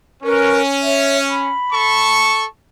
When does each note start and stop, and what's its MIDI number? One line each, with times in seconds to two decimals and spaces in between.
0.23 1.52 61
0.23 0.59 70
0.23 0.59 71
0.23 0.59 85
0.83 1.17 73
0.83 1.17 76
1.29 2.19 83
1.72 2.44 69
1.72 2.44 81
1.72 2.44 85